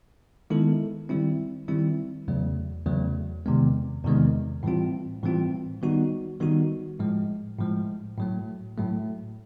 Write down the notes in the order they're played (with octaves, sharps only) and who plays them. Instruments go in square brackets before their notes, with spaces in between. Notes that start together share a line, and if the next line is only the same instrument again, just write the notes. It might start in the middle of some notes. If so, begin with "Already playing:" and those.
[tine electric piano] D#3 G#3 B3 E4 A4
D#3 G3 C4 E4
D#3 G3 C4 E4
E2 C#3 F#3 A3
E2 C#3 F#3 A3
E2 C3 D#3 G#3 B3
E2 C3 D#3 G#3 B3
A2 E3 G3 C4 F4
A2 E3 G3 C4 F4
D#3 G3 B3 D#4 F#4
D#3 G3 B3 D#4 F#4
A2 F3 G#3
A2 F3 G#3
A2 F#3 A3
A2 F#3 A3